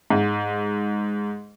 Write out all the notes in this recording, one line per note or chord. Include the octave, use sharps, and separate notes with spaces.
G#2